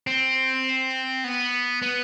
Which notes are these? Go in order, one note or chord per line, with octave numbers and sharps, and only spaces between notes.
C4
B3
B3